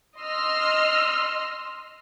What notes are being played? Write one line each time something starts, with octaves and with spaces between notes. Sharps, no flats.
D#5 C6 E6 F6